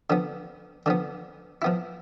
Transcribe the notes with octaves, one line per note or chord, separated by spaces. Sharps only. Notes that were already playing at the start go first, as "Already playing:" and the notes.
D3 F3 B3
D3 F3 B3
F3 B3 E4